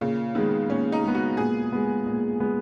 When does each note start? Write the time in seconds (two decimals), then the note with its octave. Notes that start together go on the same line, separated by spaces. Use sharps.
0.01 A#2 C#3
0.35 D#3 G#3 B3
0.69 A#2 C#4
0.92 D#4
1.04 G#3 B3
1.15 F#4
1.37 A#2 G#4
1.72 G#3 B3
2.06 A#2
2.40 G#3 B3